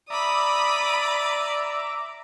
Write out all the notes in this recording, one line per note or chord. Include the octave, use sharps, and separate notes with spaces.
D5 E5 A#5 B5 D6 D#6